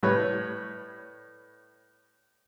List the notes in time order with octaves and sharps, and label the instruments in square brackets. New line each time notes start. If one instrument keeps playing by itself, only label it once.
[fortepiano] A2 G3 B4 C#5 B5 F#6